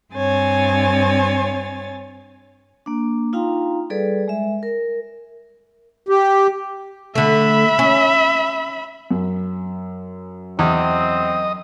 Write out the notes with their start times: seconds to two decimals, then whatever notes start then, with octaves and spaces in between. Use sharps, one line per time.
0.14 G2 C4 C#5 G#5 A6
2.86 A#3 D4
3.33 D#4 F4 F5 G5 A#5 C6
3.90 G3 G#4 A4 B4 D5
4.28 G#3 E5
4.63 A#4
6.09 G4
7.15 D3 A3 E5 B5
7.79 C#4
9.11 F#2
10.59 E2 C4 D#5